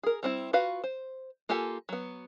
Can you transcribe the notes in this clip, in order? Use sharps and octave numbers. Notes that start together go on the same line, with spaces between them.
G#4 A#4
G3 C4 E4
F4 F#4 B4 F5
C5
A#3 F4 G4 A4 G#5
F#3 B3